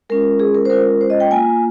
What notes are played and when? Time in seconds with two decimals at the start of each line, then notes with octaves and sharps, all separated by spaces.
0.09 G#3 C#4 F4 A#4
0.40 G#4
0.55 A#4
0.65 C5
0.70 G#3 C#4 F4 A#4
1.01 C5
1.10 D#5
1.20 G5
1.31 A#3 F4 G#5